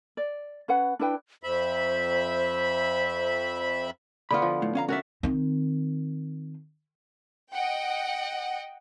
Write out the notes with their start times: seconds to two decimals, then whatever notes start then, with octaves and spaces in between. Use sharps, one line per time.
0.17 D5
0.68 C#4 B4 F#5
0.99 D4 E4 B4 G5
1.43 F2 C5 E5 B5
4.31 D3 B3 F4 B5
4.42 F3
4.62 A2
4.75 C#4 F5 A#5
4.88 C#4 F#4 A#4 D5 E5
5.23 D#3 C4
7.51 D#5 F#5 G5